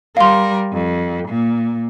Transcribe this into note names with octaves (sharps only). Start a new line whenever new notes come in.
G3 A#4 F5 C6
F2
A#2